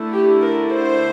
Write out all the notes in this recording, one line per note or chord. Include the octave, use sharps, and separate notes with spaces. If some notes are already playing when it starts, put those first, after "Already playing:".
Already playing: D3 A3 E4
G4
A#4
C5